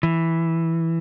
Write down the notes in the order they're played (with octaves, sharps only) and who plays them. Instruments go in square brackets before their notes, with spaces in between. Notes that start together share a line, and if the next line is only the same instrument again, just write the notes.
[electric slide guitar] E3